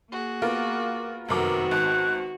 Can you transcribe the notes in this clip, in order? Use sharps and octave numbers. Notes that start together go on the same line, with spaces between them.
A#3 F#4 G#4
B3 F4 A#4 D6
F1 F#2 D#3 B3 C4 F#4 A#4 D6
G#1 F#6